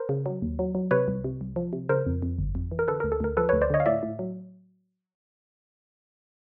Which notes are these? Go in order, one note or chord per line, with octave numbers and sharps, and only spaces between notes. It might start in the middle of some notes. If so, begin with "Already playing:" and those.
Already playing: A#4 C5
C#3
F#3
D#2
F#3
F#3
C3 B4 C#5
C2
C3
C2
F3
C3
C#3 A#4 C5
F2
F2
G1
F2
E3
A#4
D3 A4 B4
D2 A#4
A4
D2 A#4
F3 A4 B4
D2 B4 C#5
C5 D5
D3 C#5 D#5
F5
A2 D5 E5
A2
F#3